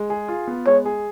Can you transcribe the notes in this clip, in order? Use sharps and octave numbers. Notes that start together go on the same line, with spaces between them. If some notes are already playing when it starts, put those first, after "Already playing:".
Already playing: G#3
G#4
F4
B3
G#3 C#5
G#4